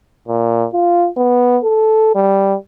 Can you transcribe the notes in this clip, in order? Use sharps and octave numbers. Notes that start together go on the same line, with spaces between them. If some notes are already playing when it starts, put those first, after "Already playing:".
A#2
F4
B3
A4
G3